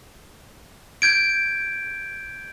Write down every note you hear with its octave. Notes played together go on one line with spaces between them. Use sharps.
G6 G#6 D7